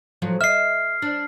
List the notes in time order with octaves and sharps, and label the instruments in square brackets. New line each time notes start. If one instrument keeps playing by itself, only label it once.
[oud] A2 F3 F#3
[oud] D#5 E5 [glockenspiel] F6 C7
[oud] D4